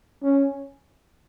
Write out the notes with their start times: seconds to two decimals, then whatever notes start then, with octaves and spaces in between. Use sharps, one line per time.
0.22 C#4